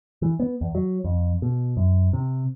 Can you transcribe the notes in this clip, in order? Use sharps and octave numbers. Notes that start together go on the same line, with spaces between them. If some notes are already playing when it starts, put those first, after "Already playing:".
E3
B3
E2
F#3
F2
B2
F#2
C3